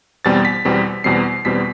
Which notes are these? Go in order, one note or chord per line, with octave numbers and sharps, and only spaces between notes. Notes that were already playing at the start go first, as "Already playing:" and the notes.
E2 B2 G3 C4 A6
B6
E2 B2 G3 C4
E2 B2 G3 C4 C7
E2 B2 G3 C4 B6